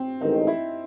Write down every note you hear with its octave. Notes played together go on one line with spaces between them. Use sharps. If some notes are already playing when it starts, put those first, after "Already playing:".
Already playing: C4
A1 G#2 D#3 D#4
E4